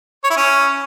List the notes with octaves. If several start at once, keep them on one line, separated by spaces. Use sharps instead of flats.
C#5
E4
C#4